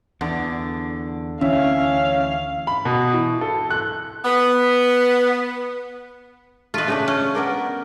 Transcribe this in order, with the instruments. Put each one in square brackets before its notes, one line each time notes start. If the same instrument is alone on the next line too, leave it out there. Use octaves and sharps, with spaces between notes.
[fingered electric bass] E2 [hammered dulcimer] D3 D6
[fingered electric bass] D2 E3 [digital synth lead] C#4 [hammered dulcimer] E5 [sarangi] F5
[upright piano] B5
B2
E3
A4
F#6
[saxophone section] B3
[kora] A3 D#5 [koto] F4 B4
[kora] C#3 A3 D4
[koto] C#4
[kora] B3 A#4 D5